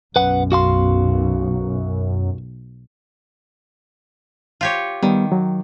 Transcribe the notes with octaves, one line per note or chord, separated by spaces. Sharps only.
B1 F#2 B4 F#5
F#4 F5 C6
F4 G4 C#5
D#3 G3 B3
F#3